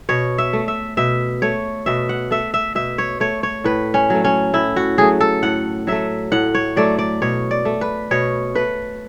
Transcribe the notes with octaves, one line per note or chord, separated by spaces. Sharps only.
B2 C#5
E5
A3
E5
B2 E5
A3 C#5
B2 E5
F#5
A3 E5
E5
B2 E5
C#5
A3 C#5
C#5
A2 B4
C#4
F#3 A3
C#4
A2 E4
F#4
F#3 A3 G#4
A4
A2 F#5
F#3 A3 E5
A2 F#5
C#5
F#3 A3 D5
D5
B2 C#5
D5
A3
B4
B2 C#5
A3 B4